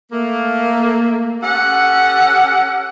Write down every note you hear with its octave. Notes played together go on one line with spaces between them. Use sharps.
A3 A#3
C#4 G4 A4 F#5